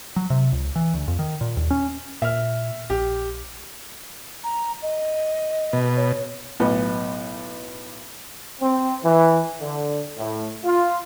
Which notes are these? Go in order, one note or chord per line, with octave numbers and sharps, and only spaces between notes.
F#3
C3
C#2
E3
D2
F2
D#3
A#2
D#2
C#4
A#2 E5 F6
A#1 G4
A#5
D#5
B2
C#5
B1 A2 B3 D#5
C4
E3
D3
A2
F4